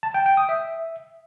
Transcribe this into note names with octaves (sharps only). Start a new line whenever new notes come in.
A5
G5
G5
D#6
E5